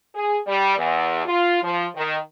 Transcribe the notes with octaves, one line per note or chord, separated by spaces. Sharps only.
G#4
G3
E2
F4
F3
D#3